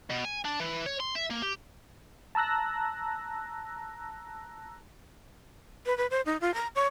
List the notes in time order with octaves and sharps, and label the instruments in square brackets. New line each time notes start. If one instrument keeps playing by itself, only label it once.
[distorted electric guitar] B2
G#5
D4
E3
C#5
C6
E5
A#3
G4
[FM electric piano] A5 A#5 E6 F#6 A#6
[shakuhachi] B4
B4
C5
D#4
F4
A#5
C#5